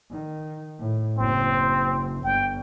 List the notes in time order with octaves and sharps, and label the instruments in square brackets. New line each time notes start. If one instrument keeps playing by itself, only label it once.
[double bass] D#3
A2
[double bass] F#1 [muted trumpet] C4
[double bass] G1 [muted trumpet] G5